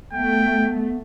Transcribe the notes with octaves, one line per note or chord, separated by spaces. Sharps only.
A3 B3 G5